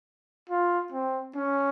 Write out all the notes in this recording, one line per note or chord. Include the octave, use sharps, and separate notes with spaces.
F4
C4
C#4